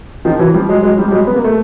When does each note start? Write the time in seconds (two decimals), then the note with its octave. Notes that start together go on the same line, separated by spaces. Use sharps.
0.25 D#3 F3
0.39 E3 F#3
0.54 F3 G3
0.69 F#3 G#3
0.82 F#3 G#3
0.98 F3 G3
1.08 G3
1.12 F#3 G#3
1.27 B3
1.36 A#3
1.44 A3